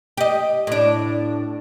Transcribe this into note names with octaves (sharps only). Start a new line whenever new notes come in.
G4 D#5
A2 D4